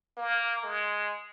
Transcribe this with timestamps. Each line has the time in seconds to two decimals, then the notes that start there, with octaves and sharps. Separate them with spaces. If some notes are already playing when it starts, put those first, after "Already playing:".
0.17 A#3
0.64 G#3